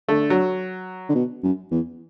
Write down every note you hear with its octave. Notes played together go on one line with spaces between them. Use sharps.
D3 A3
F#3
D3
B2
F#2
E2